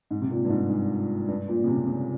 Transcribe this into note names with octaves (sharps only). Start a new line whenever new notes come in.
G#2
C3
A#2
G2
G#2
G#2
G2
A#2
C#3
C3
C#3